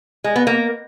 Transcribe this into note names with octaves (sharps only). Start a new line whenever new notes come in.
G#3
B3
A#3